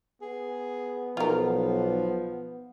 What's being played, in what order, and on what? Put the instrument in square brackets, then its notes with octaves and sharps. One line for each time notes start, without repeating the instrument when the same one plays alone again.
[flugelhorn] B3 [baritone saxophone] G#4
[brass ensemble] B1 [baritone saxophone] F3 [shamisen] F4 A#4